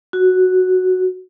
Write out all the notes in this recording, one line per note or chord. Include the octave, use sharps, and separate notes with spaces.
F#4